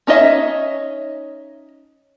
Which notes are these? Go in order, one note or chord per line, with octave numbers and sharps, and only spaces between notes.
C#4 D#4 C#5 D#5 E5